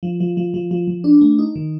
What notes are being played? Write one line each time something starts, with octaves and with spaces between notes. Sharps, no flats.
F3
F3
F3
F3
F3
F3
D4
A3
D#4
D#3